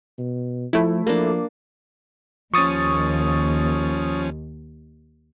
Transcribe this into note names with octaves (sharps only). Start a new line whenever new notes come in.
B2
F3 A3 E4
F3 A#3 D4
D#2 F3 C#4 C#6 D#6 A6